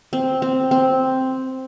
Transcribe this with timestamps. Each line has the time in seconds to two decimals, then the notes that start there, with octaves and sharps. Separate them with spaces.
0.13 C4
0.42 C4
0.71 C4